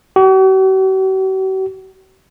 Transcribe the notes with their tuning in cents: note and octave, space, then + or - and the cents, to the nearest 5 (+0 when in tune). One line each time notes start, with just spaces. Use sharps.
F#4 +45